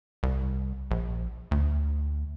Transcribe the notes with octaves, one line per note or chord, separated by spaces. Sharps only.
C2
A#1
D2